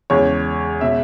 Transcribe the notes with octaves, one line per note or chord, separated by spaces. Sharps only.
E2 C#3 G#3 C#5
B2 G#3 E5